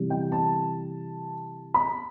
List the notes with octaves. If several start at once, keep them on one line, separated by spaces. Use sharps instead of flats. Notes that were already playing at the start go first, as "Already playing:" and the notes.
Already playing: C3 E3 G3
G5
A5
B5